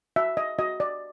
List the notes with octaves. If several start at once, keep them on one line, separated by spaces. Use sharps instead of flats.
F#4 E5
D#5
F#4 D#5
D5